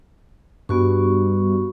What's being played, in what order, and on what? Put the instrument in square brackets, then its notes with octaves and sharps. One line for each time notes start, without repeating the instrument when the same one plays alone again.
[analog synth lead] G2 [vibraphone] B3 F#4 C#6